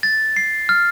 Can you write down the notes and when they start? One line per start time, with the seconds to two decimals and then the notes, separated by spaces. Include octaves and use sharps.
0.03 A6
0.36 C7
0.69 F6